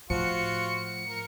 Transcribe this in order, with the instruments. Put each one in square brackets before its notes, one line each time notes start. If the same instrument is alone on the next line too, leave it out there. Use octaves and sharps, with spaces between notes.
[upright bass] A2 [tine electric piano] F3 [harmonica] F4 F#4 [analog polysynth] C#7
[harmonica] A#4